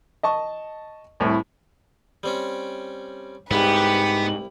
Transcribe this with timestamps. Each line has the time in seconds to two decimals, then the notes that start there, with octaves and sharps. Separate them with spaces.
0.23 D#5 A5 C#6
1.20 C2 A2 E4
2.23 G3 C4 C#4
3.51 C2 G#2 B3 E4 G4 B4